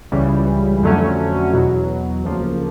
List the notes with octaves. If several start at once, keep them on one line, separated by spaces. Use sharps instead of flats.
C#2 C#3 E3 G3
F2 D3 F#3 A3 C#4
E2 B2 F#3
D2 C#3 F3 A#3